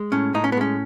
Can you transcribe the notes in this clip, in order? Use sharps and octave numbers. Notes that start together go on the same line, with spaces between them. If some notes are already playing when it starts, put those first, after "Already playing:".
Already playing: G#3
A2 C#4
A2 D#4
C#4
B3
G#3 C#4